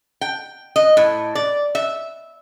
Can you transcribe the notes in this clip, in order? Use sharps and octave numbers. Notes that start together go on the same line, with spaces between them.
G5
D#5
A2
D5
E5